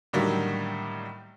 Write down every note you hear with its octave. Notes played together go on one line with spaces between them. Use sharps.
A2 D3 D#3 F#3 G3 A#3